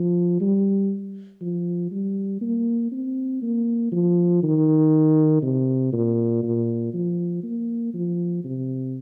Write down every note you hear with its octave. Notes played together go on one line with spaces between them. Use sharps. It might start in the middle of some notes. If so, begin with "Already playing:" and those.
Already playing: F3
G3
F3
G3
A#3
C4
A#3
F3
D#3
C3
A#2
A#2
F3
A#3
F3
C3